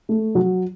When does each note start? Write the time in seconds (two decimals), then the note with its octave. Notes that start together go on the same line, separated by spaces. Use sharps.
0.09 A3
0.35 F#3